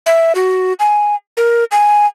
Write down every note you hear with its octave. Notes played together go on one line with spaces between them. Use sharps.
E5
F#4
G#5
A#4
G#5